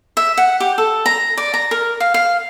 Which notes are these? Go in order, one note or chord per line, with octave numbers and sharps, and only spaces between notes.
E5
F#5
G4
A4
A#5
D5
A#5
A#4
F5
F5